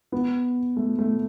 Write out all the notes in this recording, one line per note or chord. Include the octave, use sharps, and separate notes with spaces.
B3
A3
A3